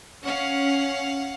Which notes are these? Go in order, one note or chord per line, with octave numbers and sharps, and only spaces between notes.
C#4 F5 F#5